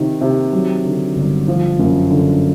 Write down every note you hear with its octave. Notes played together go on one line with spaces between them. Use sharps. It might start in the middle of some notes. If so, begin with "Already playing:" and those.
Already playing: C3 D#3
C3
F#3
D3
G1
F3
F#2
D3